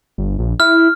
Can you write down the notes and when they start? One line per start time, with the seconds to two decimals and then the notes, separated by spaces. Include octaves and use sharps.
0.18 G1
0.39 A#1
0.60 E4 F6